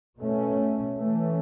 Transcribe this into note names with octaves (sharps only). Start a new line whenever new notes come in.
B2 A3 C#4
E3 A3 C#4